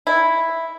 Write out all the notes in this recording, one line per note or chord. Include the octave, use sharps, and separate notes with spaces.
E4